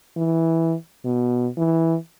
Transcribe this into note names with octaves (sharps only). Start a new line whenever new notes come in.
E3
B2
E3